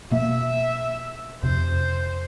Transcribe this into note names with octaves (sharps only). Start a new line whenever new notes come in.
B2 A#3 E5
F2 C3 C5